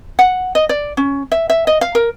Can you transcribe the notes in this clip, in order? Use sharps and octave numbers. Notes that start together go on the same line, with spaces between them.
F#5
D#5
D5
C#4
E5
E5
D#5
F5
A#4